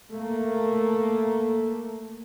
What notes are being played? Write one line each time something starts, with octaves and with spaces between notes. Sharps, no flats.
A3 A#3